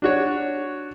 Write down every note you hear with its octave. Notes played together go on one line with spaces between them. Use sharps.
D4 F#4 C#5